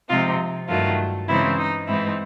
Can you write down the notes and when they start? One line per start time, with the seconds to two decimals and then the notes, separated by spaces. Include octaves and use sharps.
0.10 C3 F3 G#3 C4 D#4 F4
0.69 G2 D#3 F#3 A3 F4
1.28 C#3 E3 G#3 C4 D#4 E4
1.58 D#4
1.88 G#2 E3 G#3 C4 D#4 E4